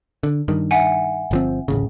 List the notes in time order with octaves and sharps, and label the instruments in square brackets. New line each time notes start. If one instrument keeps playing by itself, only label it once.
[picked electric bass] D3
G2 D#3
[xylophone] E5 F#5 G#5
[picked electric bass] G1 F3 C4
D1 A1 C#3